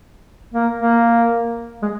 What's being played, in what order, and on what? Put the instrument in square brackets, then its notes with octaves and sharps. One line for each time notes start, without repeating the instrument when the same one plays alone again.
[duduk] A#3
A#3
G#3